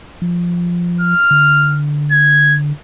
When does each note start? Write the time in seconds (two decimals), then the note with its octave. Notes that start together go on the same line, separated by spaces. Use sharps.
0.22 F3
1.00 F6
1.31 D3
2.12 G#6